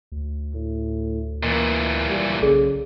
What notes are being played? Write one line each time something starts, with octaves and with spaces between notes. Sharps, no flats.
D2
A2
A#2 E3 A#3 D#5
G3
B1 C#3 G#4 A4 D5